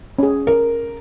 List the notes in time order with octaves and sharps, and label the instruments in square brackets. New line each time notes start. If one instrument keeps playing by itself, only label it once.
[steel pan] C#4 G#4
[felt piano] A#4